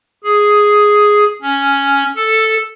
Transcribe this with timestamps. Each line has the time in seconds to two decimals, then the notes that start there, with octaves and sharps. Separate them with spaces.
0.24 G#4
1.42 C#4
2.16 A4